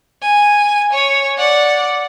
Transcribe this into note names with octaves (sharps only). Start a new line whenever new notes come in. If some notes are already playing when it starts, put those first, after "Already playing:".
G#5
C#5
D5 F#5